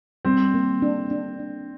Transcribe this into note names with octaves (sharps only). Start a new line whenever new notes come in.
G3 C4
A#3
D4
D4
D4